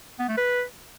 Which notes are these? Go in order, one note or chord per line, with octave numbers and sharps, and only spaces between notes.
B3
A3
B4